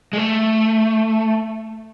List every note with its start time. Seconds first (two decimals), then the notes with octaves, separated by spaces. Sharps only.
0.13 G#3
0.17 A3